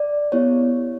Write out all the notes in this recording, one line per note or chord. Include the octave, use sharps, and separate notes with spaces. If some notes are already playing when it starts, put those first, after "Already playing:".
Already playing: D5
B3 E4 G4 C#5